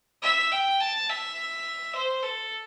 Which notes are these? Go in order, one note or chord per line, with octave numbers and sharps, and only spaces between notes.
E5
G5
A5
E5
C5
A4